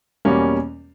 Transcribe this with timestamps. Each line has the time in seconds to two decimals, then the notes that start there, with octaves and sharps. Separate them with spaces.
0.25 E2 B2 G3 A#3 C#4